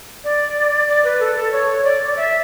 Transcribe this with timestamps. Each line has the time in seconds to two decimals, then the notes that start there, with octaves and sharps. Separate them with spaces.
0.24 D5
0.88 D5
1.04 B4
1.20 A4
1.36 A4
1.52 C#5
1.84 D5
2.17 E5